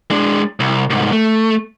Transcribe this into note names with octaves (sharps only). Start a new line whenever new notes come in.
G#3 D4
C2
C2 G#2
A3